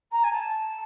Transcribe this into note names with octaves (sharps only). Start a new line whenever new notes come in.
A#5
G#5
A5